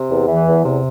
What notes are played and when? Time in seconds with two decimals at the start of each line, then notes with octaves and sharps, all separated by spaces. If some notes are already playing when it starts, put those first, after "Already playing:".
Already playing: C3
0.11 E2
0.28 E3
0.48 E2
0.65 C3